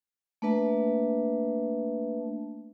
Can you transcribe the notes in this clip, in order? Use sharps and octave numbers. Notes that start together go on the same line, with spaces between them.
A3 A#3 D4 B4 E5 A5